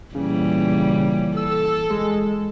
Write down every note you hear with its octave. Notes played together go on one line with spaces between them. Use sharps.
A#2 C#3 E3 G3
A4 E6
G#3